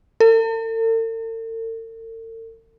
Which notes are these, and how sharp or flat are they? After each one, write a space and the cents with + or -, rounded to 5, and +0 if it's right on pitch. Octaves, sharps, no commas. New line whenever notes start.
A4 +45